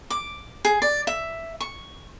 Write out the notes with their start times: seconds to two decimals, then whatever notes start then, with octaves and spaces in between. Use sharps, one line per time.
0.10 D6
0.65 G#4
0.82 D5
1.07 E5
1.61 C#6